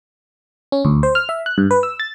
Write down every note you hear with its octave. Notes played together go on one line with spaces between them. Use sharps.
C#4
D2
C5
F6
E5
F#6
G2
B4
E6
A6